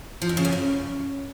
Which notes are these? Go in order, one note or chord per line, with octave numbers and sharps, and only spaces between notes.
F3
F2
C#3
F#2
C#3